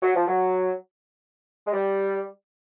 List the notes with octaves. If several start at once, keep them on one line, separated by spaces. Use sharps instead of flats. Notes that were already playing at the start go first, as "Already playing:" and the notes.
F#3
F3
F#3
G#3
G3